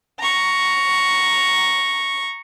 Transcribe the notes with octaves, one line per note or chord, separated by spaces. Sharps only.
A#5 C#6